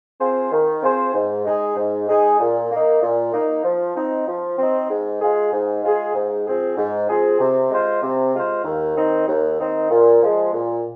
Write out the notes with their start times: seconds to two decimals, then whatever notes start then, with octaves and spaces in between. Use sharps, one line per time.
0.20 C4 F4 G#4 C5
0.52 D#3
0.83 C4 F4 G#4 C5
1.14 G#2
1.45 G#3 D#4 G#4
1.76 G#2
2.08 G#3 D#4 G#4
2.40 A#2
2.71 A#3 D#4
3.02 A#2
3.33 A#3 D#4
3.64 F3
3.96 C4 D#4
4.28 F3
4.58 C4 D#4
4.90 G#2
5.21 G#3 F4 G#4
5.52 G#2
5.83 G#3 F4 G#4
6.15 G#2
6.46 F3 C4 G#4
6.77 G#2
7.08 F3 C4 G#4
7.40 C3
7.71 G#3 F4 C5
8.03 C3
8.34 G#3 F4 C5
8.65 D#2
8.97 D#3 C4 D#4
9.28 D#2
9.60 D#3 C4 D#4
9.90 A#2
10.22 F3 G#3
10.53 A#2